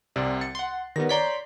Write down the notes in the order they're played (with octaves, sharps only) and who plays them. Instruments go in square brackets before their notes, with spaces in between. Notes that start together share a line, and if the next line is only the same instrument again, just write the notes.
[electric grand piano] C2 C3 [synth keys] D5
[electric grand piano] A6 [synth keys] C#7
[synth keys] F#5 C6
[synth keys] D#3 G3 B3 [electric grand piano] A#6
[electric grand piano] C#5 D5 A#5 [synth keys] C6 G6 B6